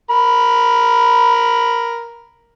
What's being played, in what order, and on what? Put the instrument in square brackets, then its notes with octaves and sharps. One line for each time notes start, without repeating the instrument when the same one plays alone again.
[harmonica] A#4 B5